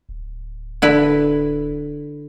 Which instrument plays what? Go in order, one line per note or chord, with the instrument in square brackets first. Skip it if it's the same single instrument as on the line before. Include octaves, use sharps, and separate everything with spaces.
[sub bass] D1
[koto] D3 E4 B4